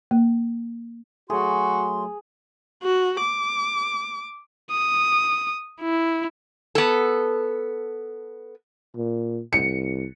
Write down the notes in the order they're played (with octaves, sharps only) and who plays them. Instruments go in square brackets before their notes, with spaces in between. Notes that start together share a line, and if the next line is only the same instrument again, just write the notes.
[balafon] A#3
[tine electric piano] F#3 A3 [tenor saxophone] F#4 [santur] G#4 [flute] C6
[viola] F#4
D6
[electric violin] D#6
E4
[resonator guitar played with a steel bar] B3 A4
[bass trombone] A#2
[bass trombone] C2 [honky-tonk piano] C#7